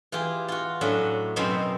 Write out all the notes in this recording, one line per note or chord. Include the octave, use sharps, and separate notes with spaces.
E3 F4 G4 G#4
F4 F#4
A2 F#3 C#4 D4 E5
F#2 B2 C4 D#4 C5 E5